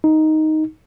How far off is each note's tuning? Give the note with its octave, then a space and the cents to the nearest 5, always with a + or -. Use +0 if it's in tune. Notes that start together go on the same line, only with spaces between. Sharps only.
D#4 +5